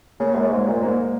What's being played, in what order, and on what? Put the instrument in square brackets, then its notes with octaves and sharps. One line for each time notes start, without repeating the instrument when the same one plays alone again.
[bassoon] C#3 [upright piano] A#3
[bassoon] F#2 [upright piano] G#3
[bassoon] G#2 [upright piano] G#3
[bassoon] A#2 [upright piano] G#3
[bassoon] G#2 [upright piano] A#3